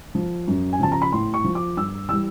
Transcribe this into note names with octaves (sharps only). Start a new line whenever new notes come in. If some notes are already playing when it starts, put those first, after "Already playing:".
F3
F#2
G#5
C#3 F3 A5
A#5
B5
A2 C6
C#6
F3
D6
G2 E6
E3 G3 E6